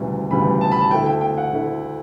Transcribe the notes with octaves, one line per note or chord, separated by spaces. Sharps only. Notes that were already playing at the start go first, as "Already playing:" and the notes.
Already playing: E1 D2 C#3 E3 G3
E1 D2 C#3 E3 G3 B5
A5
B5
A5
D2 D3 A3 E4 G5
G5
G5
F#5
D2 D3 A3 E4